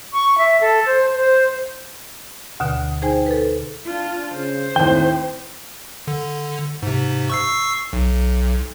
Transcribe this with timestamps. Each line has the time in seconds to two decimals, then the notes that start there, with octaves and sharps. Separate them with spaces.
0.13 C#6
0.38 E5
0.61 A4
0.86 C5
1.15 C5
2.60 D2 B2 D3
3.02 D#4 G#4 C5 G5 G#5
3.26 A4 B4
3.86 D4 F4
4.33 C#3 C5
4.76 D#2 A2 C4 G5
6.07 D3
6.83 G#2 C3
7.30 C#6 E6 C7
7.93 B1